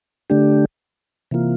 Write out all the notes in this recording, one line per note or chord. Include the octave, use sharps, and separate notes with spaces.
D3 A3 D4 G4
C3 E3 A#3 F4